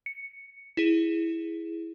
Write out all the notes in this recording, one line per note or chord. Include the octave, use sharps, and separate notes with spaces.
C#7
E4 G#4